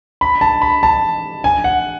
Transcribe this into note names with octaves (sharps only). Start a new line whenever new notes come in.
B5
A5
B5
A5
G#5
F#5